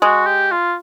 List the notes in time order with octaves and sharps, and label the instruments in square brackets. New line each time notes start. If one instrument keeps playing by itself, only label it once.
[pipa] G#3 [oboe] F#4
[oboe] G4
F4